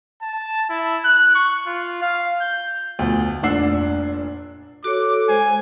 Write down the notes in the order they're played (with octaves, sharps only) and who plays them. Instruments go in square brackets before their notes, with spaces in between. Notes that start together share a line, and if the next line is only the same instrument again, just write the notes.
[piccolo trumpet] A5
E4
F#6
C#6
F4
F5
G6
[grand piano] D2 B2 F3
F1 A#2 D4 F#5 E6 C7
[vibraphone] F#4 C#5 [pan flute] A4 [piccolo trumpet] D6
[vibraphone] G#3 C5 [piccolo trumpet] G#5